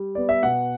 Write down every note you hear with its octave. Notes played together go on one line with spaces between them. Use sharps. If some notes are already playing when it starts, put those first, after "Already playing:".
Already playing: G3
B3 D5
E5
B2 F#5